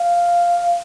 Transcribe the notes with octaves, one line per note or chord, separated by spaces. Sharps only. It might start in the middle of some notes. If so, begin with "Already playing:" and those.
Already playing: F5